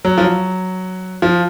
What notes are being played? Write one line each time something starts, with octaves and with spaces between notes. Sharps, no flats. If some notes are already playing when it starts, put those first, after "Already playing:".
F#3
F3
F#3
F3